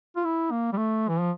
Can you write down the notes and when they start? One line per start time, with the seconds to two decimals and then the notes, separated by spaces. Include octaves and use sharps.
0.16 F4
0.24 E4
0.51 A#3
0.73 G3
0.77 A3
1.09 E3
1.20 F3